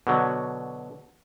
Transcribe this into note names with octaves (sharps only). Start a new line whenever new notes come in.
B2 D3 F#3